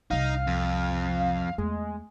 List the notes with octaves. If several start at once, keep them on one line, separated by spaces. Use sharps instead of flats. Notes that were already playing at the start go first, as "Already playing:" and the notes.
C2 C3 D#4 F5
F2
E2 G#3 A3